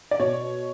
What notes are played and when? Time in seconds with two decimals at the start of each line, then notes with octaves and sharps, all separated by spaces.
0.11 D5
0.19 B2 C#5